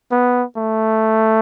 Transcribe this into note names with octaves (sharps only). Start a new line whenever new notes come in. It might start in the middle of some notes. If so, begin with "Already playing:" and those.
B3
A3